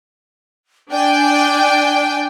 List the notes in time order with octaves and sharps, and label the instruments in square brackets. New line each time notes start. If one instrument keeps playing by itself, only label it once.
[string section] D4 G5 G#5 [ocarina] D5